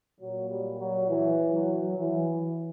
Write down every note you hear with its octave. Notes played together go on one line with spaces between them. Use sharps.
A#2 F#3
G3
F#3
E3
F#3
E3